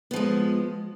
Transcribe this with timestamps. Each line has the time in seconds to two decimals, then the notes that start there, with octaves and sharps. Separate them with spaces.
0.11 B3
0.14 F3
0.16 G#3